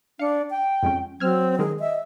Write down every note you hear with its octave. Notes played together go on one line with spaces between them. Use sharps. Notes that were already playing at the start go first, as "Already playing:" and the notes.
D4 F5 C#7
G5
F2 G#3 C#4
F#3 C4 E6 F6 G#6
D#3 G#3 G#4 A#4
D#5 E5